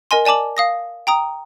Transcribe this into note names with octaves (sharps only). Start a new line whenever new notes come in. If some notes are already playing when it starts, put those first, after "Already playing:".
A#4 D#5 G#5 C6
D5 G#5 A5 D6 F#7
F5 D#6 A#6
G5 A#5 D#6